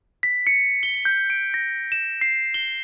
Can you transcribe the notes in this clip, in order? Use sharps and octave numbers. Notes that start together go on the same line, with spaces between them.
B6
C#7
G7
G6
D7
A#6
E7
C7
G7